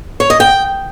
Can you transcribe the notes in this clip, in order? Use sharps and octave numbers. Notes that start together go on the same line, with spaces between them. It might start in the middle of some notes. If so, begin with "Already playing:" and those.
C#5
D#5
G5